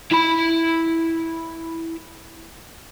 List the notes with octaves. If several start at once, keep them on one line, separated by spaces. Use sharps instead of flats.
E4 B5